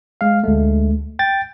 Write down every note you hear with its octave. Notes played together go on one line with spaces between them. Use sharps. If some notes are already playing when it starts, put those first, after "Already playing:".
G#3 F5
D2 G#3 A3
G5 A6